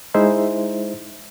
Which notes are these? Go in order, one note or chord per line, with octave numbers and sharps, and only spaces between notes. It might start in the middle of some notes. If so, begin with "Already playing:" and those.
G#3 D#4 E4 C5 E5